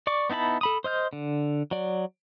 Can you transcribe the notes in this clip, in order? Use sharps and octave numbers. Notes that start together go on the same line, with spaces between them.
D5 C#6 D6
B3 D#4 E4 A5 B5
A4 B5 D#6
C5 D#5 F6 G6
D3
F#3 D5